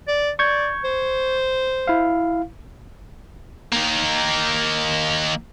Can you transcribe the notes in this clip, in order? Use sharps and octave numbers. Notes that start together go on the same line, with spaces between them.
D5
D5 C#6 G6 G#6
C5
E4 F5
D#3 A#3